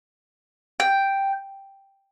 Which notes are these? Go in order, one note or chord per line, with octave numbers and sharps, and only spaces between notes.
G5